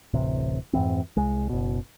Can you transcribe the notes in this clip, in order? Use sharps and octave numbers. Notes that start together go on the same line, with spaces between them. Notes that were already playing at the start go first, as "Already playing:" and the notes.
D1 A1 C3
F2 G#2 E3 C4
C2 G#3
F#1 B2